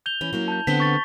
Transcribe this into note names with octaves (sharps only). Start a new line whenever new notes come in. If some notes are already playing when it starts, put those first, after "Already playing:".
G6 F7 G7
E3 C#4
F#3 A#3 C#4
A5 G6
D3 B3 C4 B6 G7
C#6 A6 G7